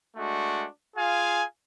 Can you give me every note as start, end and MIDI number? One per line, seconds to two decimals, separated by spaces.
0.17 0.66 56
0.17 0.66 57
0.17 0.66 62
0.17 0.66 66
0.96 1.43 65
0.96 1.43 68
0.96 1.43 77
0.96 1.43 80